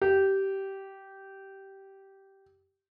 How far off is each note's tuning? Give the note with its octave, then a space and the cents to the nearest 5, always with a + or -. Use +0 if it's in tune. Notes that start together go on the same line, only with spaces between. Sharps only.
G4 -15